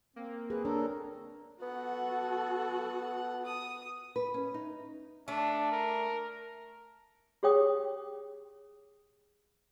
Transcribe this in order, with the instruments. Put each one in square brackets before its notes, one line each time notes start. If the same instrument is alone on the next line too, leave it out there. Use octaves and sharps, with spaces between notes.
[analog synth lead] A#3 [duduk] C4
[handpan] G#4 [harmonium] B4
[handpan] D4 C#5 [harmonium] A4 A#4
[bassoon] B3 [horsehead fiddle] F#4 A4 [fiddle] F#5
[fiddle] D#6
[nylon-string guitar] B4
C#4
D#4
[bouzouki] A3 [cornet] D4
[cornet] A#4
[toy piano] G4 G#4 C#5 G5 D#6